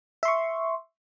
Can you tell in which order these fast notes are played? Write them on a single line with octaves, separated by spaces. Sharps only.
E5 C6 C#6